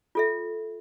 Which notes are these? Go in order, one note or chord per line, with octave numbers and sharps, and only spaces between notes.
F4 A4 E5